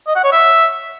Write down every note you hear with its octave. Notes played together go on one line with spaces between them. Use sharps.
D#5
F#5
C#5
E5